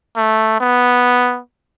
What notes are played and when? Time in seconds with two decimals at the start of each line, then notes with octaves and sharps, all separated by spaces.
0.17 A3
0.60 B3